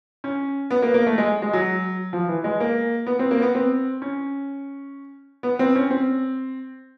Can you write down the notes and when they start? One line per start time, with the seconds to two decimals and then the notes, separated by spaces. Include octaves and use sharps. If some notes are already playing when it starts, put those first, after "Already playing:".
0.24 C#4
0.71 B3
0.83 A#3
0.94 A#3
1.06 A3
1.18 G#3
1.42 G#3
1.53 F#3
2.13 F3
2.28 E3
2.44 G#3
2.60 A#3
3.06 B3
3.19 C4
3.31 A#3
3.42 B3
3.55 C4
4.02 C#4
5.43 B3
5.59 C4
5.75 C#4
5.90 C4